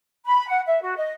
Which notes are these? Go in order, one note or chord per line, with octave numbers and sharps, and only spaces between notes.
B5
F#5
E5
F#4
D#5